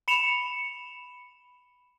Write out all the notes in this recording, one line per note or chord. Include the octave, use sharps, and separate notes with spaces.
B5 C#7 E7 F7